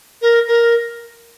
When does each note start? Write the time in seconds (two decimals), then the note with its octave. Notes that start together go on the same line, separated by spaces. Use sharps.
0.22 A#4
0.47 A#4